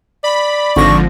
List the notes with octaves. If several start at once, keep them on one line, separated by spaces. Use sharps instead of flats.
D5 B5
G#1 D3 F3 C#6 A#6